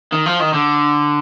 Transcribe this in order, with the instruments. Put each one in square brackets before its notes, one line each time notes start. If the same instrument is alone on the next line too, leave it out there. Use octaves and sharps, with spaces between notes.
[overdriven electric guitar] D#3
F3
D#3
D3